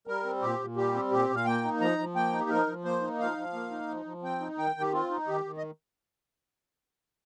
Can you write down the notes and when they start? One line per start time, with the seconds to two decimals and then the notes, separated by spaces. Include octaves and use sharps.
0.07 G3 A#4
0.25 C4
0.42 A#2 G4
0.60 A#2
0.76 G3 G4
0.94 C4
1.11 A#2 G4
1.29 A#2
1.35 F5
1.45 A#3 G5
1.63 D#4
1.80 F3 A#5
1.98 F3
2.15 A#3 G5
2.32 D#4
2.40 G4
2.50 F3 A#4
2.67 F3
2.84 A#3 C5
3.02 D#4
3.19 F3 F5
3.37 F3
3.53 A#3
3.71 D#4
3.89 F3
4.06 F3
4.23 C4 G5
4.40 D#4
4.58 D#3 G5
4.75 D#3
4.81 G4
4.92 C4 F4
5.10 D#4
5.27 D#3 G4
5.45 D#3
5.57 D#5